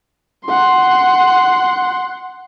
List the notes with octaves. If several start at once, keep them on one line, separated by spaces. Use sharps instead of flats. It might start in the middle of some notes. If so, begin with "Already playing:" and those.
F#5 C6